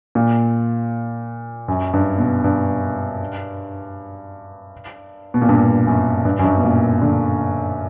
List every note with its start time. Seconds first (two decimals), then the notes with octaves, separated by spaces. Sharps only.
0.15 A#2
1.68 F#2
1.93 G2
2.18 B2
2.44 G2
5.34 B2
5.42 A#2
5.49 G2
5.87 F#2
6.25 G2
6.39 F#2
6.44 G2
6.58 B2
6.63 A#2
7.02 D3